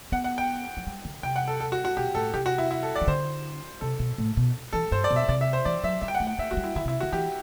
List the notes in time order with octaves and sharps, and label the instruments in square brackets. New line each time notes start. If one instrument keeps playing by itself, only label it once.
[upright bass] B3 [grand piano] F#5
[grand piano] F#5
G5
[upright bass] F#3
G3
D3
[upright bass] C3 [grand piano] G5
[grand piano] F#5
A4
A4
F#4
F#4
[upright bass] B2 [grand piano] G4
[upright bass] A2 [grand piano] A4
[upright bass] C3 [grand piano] G4
[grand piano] F#4
E4
E4
A4
D5
[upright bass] E3
[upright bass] D3 [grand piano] C5
[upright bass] C3 [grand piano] A4
[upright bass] B2
A2
B2
[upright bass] E3 [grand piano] A4
[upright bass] G2 [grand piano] C5
[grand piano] D5
[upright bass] B2
[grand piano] E5
[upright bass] C3 [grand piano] D5
[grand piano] E5
C5
[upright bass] E3 [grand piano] D5
[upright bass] F#3 [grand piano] E5
[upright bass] G3 [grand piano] E5
[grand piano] G5
F#5
[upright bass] A3
[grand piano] F#5
[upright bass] A3 [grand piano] E5
[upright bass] A3 [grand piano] F#4
[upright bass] G3
[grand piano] E4
[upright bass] D3 [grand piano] E4
[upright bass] C3
[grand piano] E4
[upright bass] D3 [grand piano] F#4
[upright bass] E3 [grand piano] G4